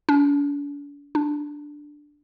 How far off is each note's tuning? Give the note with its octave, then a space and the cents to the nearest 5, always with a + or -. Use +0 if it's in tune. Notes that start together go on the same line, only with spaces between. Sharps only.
D4 -45
D4 +0